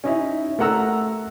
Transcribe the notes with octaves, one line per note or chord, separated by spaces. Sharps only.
C#4 D#4 E4
A3 A#4 F#5 A#5 E6